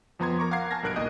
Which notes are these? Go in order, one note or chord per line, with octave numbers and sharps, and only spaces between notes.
F2 F3 B3 A#5 C6 G#6
A#4 A#5 C#6 D6
F5 F#5 A#5 D6 G#6 C7
G#5 A5 F6 G#6 A#6
B1 G2 A#4 F#6 G#6 D7
D#2 A#2 D#5 D#6 G6